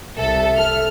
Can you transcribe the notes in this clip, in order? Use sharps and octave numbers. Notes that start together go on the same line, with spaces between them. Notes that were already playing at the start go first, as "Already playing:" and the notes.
C2 A4 E5
A4 F6